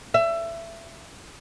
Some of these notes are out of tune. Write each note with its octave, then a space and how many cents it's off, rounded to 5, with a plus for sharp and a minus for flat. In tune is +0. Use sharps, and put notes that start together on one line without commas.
E5 +20